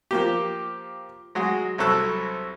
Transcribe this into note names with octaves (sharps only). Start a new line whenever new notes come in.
F3 A#3 G4
F#3 G#3 F#4
C2 F#3 A4 F#6